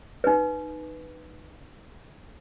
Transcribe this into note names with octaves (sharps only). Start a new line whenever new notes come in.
D#4 B4